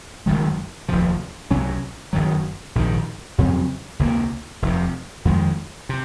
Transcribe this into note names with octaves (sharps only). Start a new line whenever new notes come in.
F#1 F#2 D#3 G#3
F1 D#2 C#3 F3
C2 C3 F#3 C#4
F#1 F#2 D#3 F#3
A#1 G#2 D#3
F2 C#3 F#3 C4
C#2 C3 D#3 A#3
F1 F2 C3
F2 D#3 G#3
C3